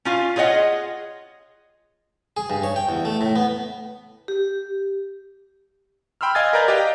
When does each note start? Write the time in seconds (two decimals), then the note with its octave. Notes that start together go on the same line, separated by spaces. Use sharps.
0.05 C#4 F4 F5
0.36 F4 G#4 C#5 D#5 F#5
2.37 G#4
2.50 G2
2.63 C#5
2.76 G5
2.89 E2
3.05 A3
3.21 A2
3.36 B3
4.28 G4
6.21 G5 B5 C6 E6 F6
6.35 D#5 F5 G#5 D#6 G#6 A6
6.53 A#4 B4 D5 A#5 G6 A6
6.68 G4 B4 D#5 F5 G5